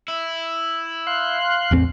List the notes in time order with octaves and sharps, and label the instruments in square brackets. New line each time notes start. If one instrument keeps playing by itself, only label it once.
[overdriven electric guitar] E4
[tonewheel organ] F5 C6 F#6
[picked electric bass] A1 E2 C4